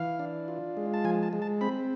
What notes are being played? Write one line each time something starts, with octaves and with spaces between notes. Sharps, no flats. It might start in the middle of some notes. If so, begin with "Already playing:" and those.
Already playing: E3 F5
D4
F4
G#3
A5
F3 G#5
A5
G#3
A5
C4 B5